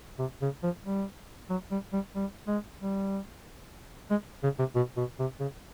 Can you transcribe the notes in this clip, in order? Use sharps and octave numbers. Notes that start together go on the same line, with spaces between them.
C3
C#3
F3
G3
F#3
G3
G3
G3
G#3
G3
G#3
C#3
C3
B2
B2
C3
C#3